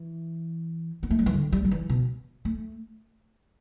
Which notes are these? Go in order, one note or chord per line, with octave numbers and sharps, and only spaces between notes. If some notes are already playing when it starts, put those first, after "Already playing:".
Already playing: E3
B3
A3
G3
E3
D3
G3
G3
E3
B2
A3